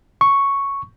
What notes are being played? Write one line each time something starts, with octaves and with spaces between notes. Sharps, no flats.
C#6